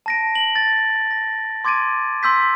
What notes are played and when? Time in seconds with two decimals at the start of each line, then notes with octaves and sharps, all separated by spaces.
0.06 A5 A#6 D7
0.35 F#7
0.56 A6
1.11 A#6
1.64 C6 D6 G#6 A6 D7 D#7
2.23 C6 E6 G6 B6